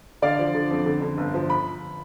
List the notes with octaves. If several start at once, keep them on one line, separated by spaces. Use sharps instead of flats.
D3 D5 F5
F3
D3
F2
D3
D3
G1
F3
B5